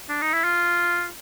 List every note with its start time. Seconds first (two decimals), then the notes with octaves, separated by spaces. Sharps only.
0.09 D4
0.21 D#4
0.34 E4
0.44 F4